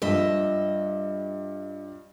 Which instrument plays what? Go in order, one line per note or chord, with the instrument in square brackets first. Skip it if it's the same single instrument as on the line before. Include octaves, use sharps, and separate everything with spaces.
[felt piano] G2 F3 [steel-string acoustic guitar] D#5 E5